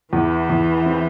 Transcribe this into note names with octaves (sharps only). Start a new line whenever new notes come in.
E2 E3
E2
C4